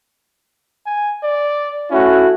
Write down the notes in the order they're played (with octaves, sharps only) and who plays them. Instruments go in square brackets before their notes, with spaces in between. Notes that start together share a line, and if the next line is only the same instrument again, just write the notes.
[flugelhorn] G#5
D5
[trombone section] A3 E4 F#4 [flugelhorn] C#4